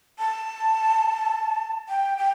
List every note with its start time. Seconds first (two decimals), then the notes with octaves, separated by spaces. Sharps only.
0.19 A5
1.89 G5
2.18 G5